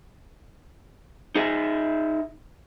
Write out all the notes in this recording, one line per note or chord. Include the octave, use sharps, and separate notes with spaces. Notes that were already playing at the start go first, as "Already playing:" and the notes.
D#4 G#4 D#5 E5